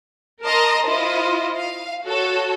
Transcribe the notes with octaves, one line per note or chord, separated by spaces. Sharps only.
A#4 D#5 A5 A#5 C6
E4 F4 C5 D#5
F5
F#4 A4 C#5